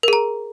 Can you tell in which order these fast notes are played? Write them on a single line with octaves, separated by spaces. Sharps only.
A#4 G#4 A#5